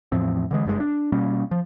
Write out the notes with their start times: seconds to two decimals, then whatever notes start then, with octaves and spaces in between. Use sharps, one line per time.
0.12 E2 A2 F3 C4
0.51 D3 E3 G#3
0.65 F#1 G2 A#2 G#3
0.80 D4
1.12 B2 G3 A#3 C#4
1.51 F3